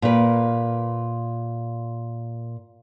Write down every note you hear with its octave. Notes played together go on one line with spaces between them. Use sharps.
A#2 A#4 B4